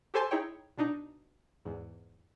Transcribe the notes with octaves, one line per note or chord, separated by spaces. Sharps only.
G4 A4 C5 G#5 A5 C6
D#4 E4 G#4 C#5 G5
B2 D4 D#4
E2 G#2